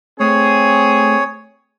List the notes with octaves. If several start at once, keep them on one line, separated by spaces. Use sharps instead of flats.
A3 C4 G#4 C#5